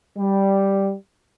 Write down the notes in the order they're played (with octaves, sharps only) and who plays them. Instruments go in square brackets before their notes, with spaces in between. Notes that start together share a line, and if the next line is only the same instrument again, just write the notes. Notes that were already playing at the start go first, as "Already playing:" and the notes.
[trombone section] G3